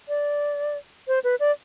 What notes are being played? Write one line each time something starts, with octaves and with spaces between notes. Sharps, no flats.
D5
C5
B4
D5